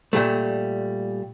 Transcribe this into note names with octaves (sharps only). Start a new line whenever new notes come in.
A#2 G3 A3